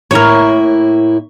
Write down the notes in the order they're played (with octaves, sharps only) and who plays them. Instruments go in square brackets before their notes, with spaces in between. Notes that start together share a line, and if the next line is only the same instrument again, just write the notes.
[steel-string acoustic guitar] A2 A#3 E4 [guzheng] A#4 C#5